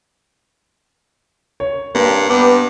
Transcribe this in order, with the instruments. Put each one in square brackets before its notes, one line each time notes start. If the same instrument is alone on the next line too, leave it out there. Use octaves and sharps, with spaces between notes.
[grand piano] C#5
[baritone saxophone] G2 [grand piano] A#3
[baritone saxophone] G2 [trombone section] B3 [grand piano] D6